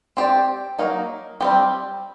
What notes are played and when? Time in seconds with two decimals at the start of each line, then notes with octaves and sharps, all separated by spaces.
0.17 C4 G4 D5
0.79 F#3 A#3 D#4
1.41 G3 C4 G4